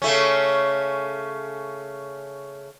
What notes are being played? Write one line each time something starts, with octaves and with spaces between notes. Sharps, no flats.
C#3 A3 C#4